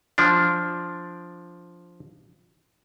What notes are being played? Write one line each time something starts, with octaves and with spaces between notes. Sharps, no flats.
F3 D4